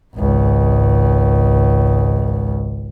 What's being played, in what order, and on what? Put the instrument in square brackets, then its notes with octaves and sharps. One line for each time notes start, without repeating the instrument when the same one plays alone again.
[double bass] G#1 C#2